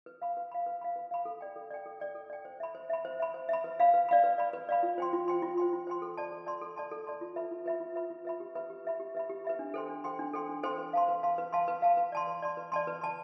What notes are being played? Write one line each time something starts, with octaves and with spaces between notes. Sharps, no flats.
B4
F5 B5
B4
F5 B5
B4
F5 B5
B4
F5 B5
A4
D5 G5
A4
D5 G5
A4
D5 G5
A4
D5 G5
C5
E5 B5
C5
E5 B5
C5
E5 B5
C5
E5 B5
B4
D5 F5 B5
B4
D5 F5 B5
B4
D5 F5 B5
B4
D5 F5 B5
F4
C5 G5 C6
F4
C5 G5 C6
F4
C5 G5 C6
F4
C5 G5 C6
A4
D5 A5 C6
A4
D5 A5 C6
A4
D5 A5 C6
A4
D5 A5 C6
F4
B4 E5 B5
F4
B4 E5 B5
F4
B4 E5 B5
F4
B4 E5 B5
G4
B4 E5 B5
G4
B4 E5 B5
G4
B4 E5 B5
G4
B4 E5 B5
D4
A4 C5 G5 C6
D4
A4 C5 G5 C6
D4
A4 C5 G5 C6
D4
A4 C5 G5 C6
B4
F5 A5 C6
B4
F5 A5 C6
B4
F5 A5 C6
B4
F5 A5 C6
B4
D5 A5 C6
B4
D5 A5 C6
B4
D5 A5 C6
B4
D5 A5 C6